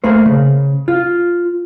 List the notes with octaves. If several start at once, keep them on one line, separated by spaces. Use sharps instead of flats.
A3 A#3 C5
C#3
F4